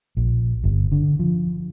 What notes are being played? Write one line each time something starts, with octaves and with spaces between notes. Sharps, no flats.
A#1
G1
D3
F3